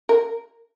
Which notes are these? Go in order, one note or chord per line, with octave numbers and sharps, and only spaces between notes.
A#4